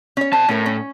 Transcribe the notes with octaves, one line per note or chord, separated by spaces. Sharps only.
C#4 C#5
C3 C5 A5
A2 C#4 A#4
C#4